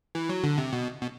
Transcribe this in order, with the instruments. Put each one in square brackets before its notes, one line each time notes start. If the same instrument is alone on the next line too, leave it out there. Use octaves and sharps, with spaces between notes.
[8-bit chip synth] E3
F#3
D3
C3
B2
B2